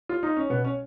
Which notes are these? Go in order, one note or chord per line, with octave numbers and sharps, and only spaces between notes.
F4
D#4
C#4
B2 B3
C#4